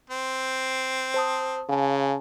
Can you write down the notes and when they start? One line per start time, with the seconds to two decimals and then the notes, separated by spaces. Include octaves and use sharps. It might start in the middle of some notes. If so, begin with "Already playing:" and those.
0.10 C4
1.14 C5 A5 D#6
1.69 C#3 F5 G#5 A5